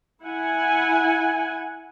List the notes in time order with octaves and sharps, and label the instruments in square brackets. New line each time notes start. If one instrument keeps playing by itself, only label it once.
[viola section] E4 F#5 G#5